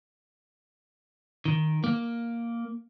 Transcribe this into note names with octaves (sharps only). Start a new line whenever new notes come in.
D#3
A#3